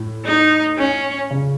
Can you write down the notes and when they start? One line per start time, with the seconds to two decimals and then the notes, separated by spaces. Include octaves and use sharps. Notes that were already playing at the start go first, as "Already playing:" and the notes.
Already playing: A2
0.25 D#4
0.78 C#4
1.31 C#3